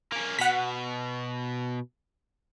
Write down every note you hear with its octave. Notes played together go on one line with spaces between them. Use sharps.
A#3 C#4
B2 F#5 B6